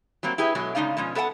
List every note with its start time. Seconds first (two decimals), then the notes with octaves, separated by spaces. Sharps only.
0.23 F#3 G3 A#3 C4
0.38 E4 G4 G#4 B4
0.55 B2 F#3 G#3 A3
0.75 A2 C#3 G#3 D#4 D5 F5
0.97 B2 F3 G#3 C#4
1.15 B3 A4 B4 F5 F#5 A5